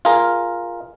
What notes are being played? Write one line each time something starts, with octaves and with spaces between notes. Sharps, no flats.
F4 G#4 A#4